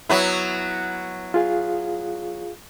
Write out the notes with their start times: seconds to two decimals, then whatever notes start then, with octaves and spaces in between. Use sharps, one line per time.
0.09 F#3 B3 E4
1.34 F4 G#4 F5